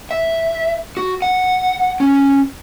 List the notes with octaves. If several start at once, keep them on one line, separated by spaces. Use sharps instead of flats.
E5
F#4
F#5
C#4